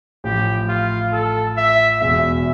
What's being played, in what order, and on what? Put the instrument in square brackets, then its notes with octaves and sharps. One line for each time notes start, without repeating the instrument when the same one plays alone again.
[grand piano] A1 A2 F3 [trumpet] G4
[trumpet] F4
A4
E5
[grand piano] E1 E2 B2 [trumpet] E5